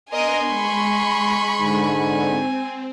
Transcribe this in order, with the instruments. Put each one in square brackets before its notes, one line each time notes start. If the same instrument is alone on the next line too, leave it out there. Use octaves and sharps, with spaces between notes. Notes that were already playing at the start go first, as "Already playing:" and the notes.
[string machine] B3 D4 [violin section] A#4 D#5 [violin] G#5 C6
[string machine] G#3 [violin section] B5 C#6
[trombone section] G#2 D3 [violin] G#5
[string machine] C4